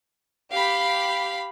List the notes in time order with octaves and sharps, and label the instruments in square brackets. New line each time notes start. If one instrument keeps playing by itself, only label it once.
[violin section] G4 B5 [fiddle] F5